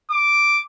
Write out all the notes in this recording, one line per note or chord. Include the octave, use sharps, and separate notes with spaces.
D6